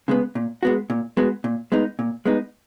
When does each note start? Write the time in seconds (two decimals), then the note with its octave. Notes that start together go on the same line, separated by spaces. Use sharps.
0.08 C#3 G#3 B3
0.35 A#2
0.63 G#3 B3 F#4
0.90 A#2
1.17 G#3 B3 F#4
1.44 A#2
1.72 G#3 B3 D#4
1.99 A#2
2.25 G#3 B3 D#4